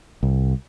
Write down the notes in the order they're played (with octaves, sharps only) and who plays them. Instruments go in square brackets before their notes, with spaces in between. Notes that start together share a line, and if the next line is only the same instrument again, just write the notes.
[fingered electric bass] C2